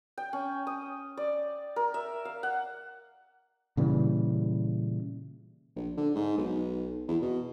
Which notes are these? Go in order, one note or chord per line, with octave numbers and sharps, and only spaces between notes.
G5
C#4
D#6
D5
A#4
E5
F5
F#5
A#2 C#3 E3 G3
A#1
D3
G#2
B1
E2
B2